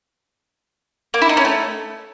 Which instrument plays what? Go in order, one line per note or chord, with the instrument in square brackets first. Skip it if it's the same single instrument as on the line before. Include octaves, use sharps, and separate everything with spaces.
[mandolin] A#3
E4
D#4
C#4
A3